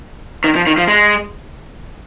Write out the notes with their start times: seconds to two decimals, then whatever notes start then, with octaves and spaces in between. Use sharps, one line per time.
0.44 D#3
0.56 F3
0.67 D#3
0.78 F3
0.88 G#3